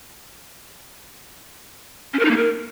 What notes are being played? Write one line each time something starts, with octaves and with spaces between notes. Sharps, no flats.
C#4
A#4
D#4
A#3
A#4